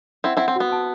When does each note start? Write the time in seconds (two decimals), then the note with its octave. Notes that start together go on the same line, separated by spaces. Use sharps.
0.24 C4 E4 F#5
0.37 C4 E4 F#5
0.48 C4
0.56 B3 F#4
0.72 A5